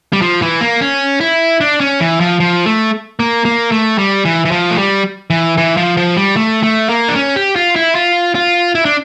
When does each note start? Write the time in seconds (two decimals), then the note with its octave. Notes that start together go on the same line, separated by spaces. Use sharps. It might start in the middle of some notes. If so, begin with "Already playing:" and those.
0.13 G3
0.22 F3
0.42 E3
0.61 A#3
0.81 C#4
1.21 E4
1.61 D4
1.81 C#4
2.00 E3
2.20 F3
2.40 F3
2.66 A3
3.20 A#3
3.45 A#3
3.72 A3
3.98 G3
4.25 E3
4.45 E3
4.51 F3
4.71 A3
4.78 G3
5.30 E3
5.57 E3
5.77 F3
5.97 F3
6.17 G3
6.37 A3
6.63 A3
6.89 A#3
7.09 D4
7.16 C#4
7.36 G4
7.56 F4
7.76 E4
7.95 F4
8.35 F4
8.75 E4
8.85 D4